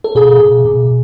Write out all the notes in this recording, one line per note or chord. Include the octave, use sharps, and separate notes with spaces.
A4
B2 G#4
B2
B2